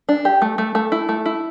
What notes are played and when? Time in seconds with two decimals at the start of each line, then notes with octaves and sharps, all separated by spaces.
0.09 D4
0.25 G4
0.42 A3
0.58 A3
0.75 A3
0.92 E4
1.09 A3
1.26 E4